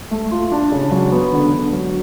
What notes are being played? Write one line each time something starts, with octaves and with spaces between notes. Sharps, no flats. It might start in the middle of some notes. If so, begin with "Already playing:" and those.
A3
F4
D4
C#3
F#3
B3
D3
D3
F#3